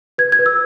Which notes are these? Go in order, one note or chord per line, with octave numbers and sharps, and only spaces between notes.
B4 G#6
G#6
B4
E6